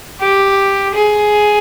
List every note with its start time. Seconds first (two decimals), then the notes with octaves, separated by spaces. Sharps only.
0.20 G4
0.94 G#4